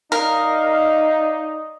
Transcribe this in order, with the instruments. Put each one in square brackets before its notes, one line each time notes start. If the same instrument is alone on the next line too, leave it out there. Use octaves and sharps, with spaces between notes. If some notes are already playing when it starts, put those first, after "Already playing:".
[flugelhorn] D#4 [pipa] A#4 [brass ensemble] D5 D#5 [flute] F5